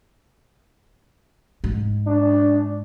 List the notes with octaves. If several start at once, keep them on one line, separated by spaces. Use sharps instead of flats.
G#2
D4